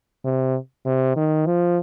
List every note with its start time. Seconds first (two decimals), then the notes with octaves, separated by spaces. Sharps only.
0.25 C3
0.86 C3
1.16 D#3
1.46 F3